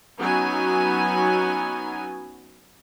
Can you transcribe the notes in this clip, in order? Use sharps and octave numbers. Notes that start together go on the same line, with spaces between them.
F#3 B3 C#4 D#4 G#5